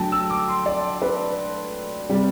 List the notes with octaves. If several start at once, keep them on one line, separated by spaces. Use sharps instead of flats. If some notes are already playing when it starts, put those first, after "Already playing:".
Already playing: D3 F#3 A3 G5 A5
E6
D6
C6
D5
B4
C3 G3